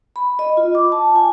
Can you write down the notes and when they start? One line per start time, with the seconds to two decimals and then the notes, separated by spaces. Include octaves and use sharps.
0.16 B5
0.39 D#5
0.57 F4
0.75 D6
0.92 A5
1.16 G#5